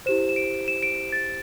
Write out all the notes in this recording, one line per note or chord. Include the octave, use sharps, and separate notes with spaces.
E4 G4 C5 E7
E7
D7
E7
D7
A6